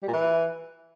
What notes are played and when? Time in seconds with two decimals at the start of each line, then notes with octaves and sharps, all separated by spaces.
0.03 G3
0.08 A#2
0.13 E3